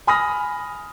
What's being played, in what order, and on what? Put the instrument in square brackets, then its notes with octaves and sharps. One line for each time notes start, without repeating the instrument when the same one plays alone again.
[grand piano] G#5 B5 D#6 F6 A#6